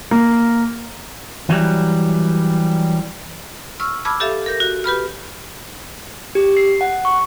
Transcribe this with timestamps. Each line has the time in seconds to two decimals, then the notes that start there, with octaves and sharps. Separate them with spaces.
0.11 A#3
1.50 E3 F#3 G3
3.80 C#6 E6 F6
4.05 A5 B5 D6 E6 F6 G#6
4.20 G4 A4 E5 F5
4.46 A#4 G6 A#6
4.60 F#4
4.84 G4 B4 B5 F6
6.35 G4
6.57 C7
6.81 F#5
7.05 C#6